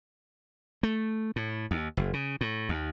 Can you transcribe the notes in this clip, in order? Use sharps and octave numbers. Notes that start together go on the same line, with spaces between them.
A3
A2
D#2
F#1
C#3
A2
D#2